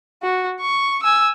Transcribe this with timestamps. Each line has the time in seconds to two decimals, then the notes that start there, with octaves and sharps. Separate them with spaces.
0.22 F#4
0.60 C#6
1.03 G#5 E6